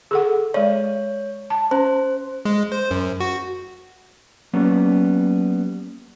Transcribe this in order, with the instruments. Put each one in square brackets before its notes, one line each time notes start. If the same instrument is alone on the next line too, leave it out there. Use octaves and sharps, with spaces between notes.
[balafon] G#4 A4 F#5
[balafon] G#3 D5 [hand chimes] C#5
[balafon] A5
[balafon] C#4 [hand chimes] C5
[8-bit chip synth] G#3
C5
F#2
F#4
[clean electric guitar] F#3 G3 A#3 B3 C#4